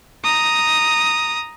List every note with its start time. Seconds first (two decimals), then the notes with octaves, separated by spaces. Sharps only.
0.24 A#5 D#6